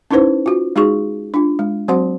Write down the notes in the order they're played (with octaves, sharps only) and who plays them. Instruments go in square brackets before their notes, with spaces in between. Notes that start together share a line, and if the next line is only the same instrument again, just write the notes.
[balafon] C#4 D#4 E4 B4 C5
F4 F#4
G#3 D#4 F#4 G#4 C#6
D4 F4
G#3
F#3 C4 F#4 C5 F#5 C6